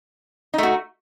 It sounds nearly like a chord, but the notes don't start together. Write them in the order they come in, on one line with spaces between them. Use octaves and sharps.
D#4 A3 F#4